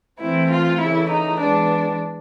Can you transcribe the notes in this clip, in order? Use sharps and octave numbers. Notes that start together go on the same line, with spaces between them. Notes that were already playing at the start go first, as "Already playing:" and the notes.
E3 A3 C4 E4
F4
C#3 E3 A3 E4
D#4
E3 G#3 B3 D4